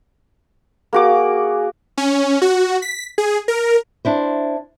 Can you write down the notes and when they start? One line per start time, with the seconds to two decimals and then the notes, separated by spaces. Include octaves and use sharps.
0.93 A#3 F#4 G#4 D6
1.98 C#4
2.42 F#4
2.82 B6
3.18 G#4
3.48 A#4
4.05 D4 E4 C5